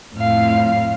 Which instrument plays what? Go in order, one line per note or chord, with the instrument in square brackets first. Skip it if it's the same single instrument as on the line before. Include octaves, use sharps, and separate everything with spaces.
[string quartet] F2 A2 F5